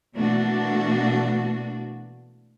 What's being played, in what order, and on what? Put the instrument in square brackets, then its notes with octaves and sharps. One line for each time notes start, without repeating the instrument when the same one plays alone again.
[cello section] B2 E3 A3 A#3 D4 F#4